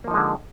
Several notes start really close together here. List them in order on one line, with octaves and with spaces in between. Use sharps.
A#3 F3 D#4 G#3 D3